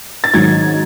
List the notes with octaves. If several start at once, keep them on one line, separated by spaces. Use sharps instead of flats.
A6
G#2 D#3 F#3 G#6